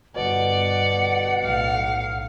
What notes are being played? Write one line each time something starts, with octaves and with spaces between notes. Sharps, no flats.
G1 B2 D5 F#5
B1 A2 F5